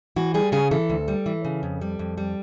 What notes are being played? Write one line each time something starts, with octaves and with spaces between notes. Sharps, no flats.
E3 F#4
G3 G#4
C#3 G#4
E3 A4
D2
G3
E3
C#3
F2
G3
F2
G3